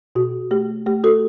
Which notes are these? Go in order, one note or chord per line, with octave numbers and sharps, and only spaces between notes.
B2 F#4
A3 G4
A3 G4
F#4 A4